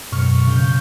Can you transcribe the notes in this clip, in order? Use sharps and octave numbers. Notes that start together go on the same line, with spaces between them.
F#2 B2 C#6 F6
C#3 G6